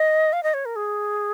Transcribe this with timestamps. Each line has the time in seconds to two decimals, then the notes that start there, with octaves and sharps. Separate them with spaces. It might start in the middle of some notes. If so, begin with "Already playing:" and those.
Already playing: D#5
0.33 F5
0.43 D#5
0.54 C#5
0.65 A#4
0.76 G#4